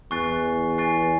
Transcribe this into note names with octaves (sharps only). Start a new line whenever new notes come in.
E2 G#5 C#6 F#6 A6 C7
G#5 C#6 F#6 A6 C7